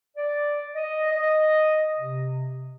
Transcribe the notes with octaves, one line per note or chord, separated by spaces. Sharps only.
D5
D#5
D#5
C3